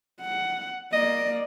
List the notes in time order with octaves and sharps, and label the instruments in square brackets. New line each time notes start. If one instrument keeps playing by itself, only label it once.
[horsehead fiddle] F#5
[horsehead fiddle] A#3 D5 [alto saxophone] D#5